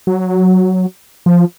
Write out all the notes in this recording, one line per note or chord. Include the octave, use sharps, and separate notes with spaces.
F#3
F3